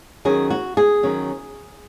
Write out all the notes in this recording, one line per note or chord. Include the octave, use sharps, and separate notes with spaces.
D#3 F#3 C#4 G#4
F#4
G#4
D#3 F#3 C#4